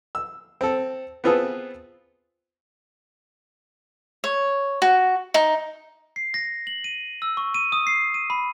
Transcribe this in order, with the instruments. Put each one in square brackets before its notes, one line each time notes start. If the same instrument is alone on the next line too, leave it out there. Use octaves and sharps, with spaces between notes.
[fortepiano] E6
C4 A4
B3 C4 F4 G#4 A4 B4
[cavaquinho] C#5
F#4
D#4
[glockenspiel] C7
A#6
F#7
D#7
E6
C#6
D#7
D#6
C7
D#7
B5